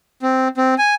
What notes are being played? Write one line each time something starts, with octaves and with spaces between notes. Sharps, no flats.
C4
C4
G#5